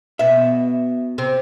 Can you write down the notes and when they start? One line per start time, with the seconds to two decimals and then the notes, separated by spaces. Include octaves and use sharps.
0.19 B2 B3 E5
1.18 C3 C4